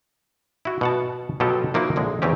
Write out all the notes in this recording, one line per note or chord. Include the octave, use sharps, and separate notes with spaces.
E4 F#4
B2 F#5 A5
B2 F#3 F4 G4 A4
F3 A#3 D#4 E4 F#4
A#1 D3 G#3
E2 E3 C4 C#4 G4